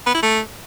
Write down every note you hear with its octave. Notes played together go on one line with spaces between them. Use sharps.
B3
E4
A3